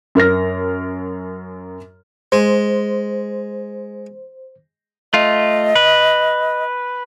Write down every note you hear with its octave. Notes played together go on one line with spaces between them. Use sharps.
F#2 A#4 F6 A#6
G#3 C5
A3 F4 D#5
B4